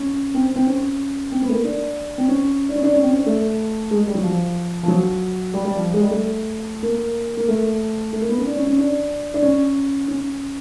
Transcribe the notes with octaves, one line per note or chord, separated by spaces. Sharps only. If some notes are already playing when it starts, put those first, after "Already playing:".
Already playing: C#4
C4
C4
C#4
C4
B3
A3
A#3
D4
C4
C#4
D4
C#4
D4
C#4
C4
C#4
D4
A3
G#3
G3
F#3
F3
F3
F#3
G3
G3
F3
G#3
G3
A3
A#3
A#3
A3
A3
A#3
B3
C#4
D4
C#4
C#4
D4
D4
C#4
C#4